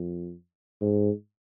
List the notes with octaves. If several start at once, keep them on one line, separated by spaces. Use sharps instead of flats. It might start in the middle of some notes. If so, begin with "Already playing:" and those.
Already playing: F2
G#2